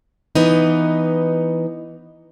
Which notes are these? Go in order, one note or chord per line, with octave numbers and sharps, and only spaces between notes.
E3 B3 D#4